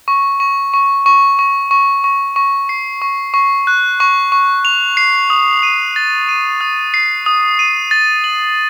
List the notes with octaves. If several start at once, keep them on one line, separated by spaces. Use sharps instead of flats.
C#6
C#6
C#6
C#6
C#6
C#6
C#6
C#6
C7
C#6
C#6
F#6
C#6
C#6
F7
C7
D#6
D#7
A6
D#7
D#6
C7
D#6
D#7
A6
F#7